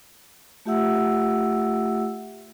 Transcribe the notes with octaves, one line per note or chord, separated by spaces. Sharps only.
A3 F4 G4 E5 F#5 E6